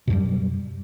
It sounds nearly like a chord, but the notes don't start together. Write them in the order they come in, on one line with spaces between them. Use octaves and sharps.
B2 F#2 G3